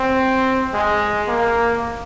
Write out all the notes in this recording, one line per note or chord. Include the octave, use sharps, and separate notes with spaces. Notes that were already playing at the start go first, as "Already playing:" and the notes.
Already playing: C4
G#3
A#3